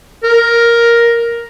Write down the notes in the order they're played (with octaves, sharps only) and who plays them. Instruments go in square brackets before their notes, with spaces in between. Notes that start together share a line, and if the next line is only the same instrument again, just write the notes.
[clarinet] A#4